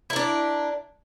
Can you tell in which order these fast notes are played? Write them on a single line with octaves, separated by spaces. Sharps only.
E4 A#4 D4